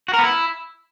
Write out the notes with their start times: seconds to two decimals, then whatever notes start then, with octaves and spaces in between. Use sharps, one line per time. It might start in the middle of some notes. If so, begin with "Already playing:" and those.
0.08 F#4
0.14 A#4
0.19 B3
0.24 E4